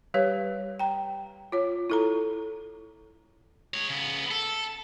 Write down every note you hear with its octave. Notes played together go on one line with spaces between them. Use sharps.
G3 G4 B4 C#5
G5 A#5
F4 C#5
E4 A4 A#5
G#3 C#5
C#3 B3
A4